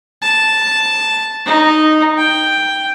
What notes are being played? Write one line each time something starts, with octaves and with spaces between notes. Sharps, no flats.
A5
D#4
G5